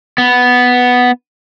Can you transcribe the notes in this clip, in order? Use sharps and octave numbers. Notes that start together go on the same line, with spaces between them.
B3